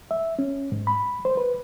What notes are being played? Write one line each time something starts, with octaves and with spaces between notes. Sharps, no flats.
E5
C#4
G#2
B5
C5
B4